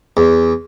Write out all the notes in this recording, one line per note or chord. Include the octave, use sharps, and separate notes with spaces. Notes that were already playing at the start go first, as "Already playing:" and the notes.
E2